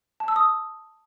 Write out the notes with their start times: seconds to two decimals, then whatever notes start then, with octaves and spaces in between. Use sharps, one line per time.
0.20 A5
0.28 E6
0.36 D#6